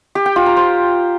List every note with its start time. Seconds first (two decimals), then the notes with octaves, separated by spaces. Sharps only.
0.15 G4
0.26 G5
0.36 F4
0.46 A#5
0.57 C5